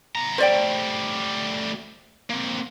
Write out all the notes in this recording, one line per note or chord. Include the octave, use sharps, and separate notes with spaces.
B3 A#5
G3 A3 C5 D5 G5
A#3 C4